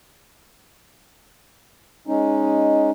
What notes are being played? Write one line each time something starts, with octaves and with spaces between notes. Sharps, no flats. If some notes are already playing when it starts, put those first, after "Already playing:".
G#3 C#4 D#4